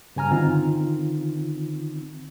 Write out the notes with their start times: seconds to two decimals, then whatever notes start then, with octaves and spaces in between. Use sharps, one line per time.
0.16 G2 C#3 G#5 A#5 F6
0.31 D3 D#3 C4 D#4 F4